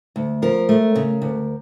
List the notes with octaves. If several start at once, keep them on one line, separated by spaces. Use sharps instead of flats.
D2
F3 A#4
A3
C#3
D2